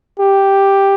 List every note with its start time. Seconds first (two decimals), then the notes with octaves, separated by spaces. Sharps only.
0.19 G4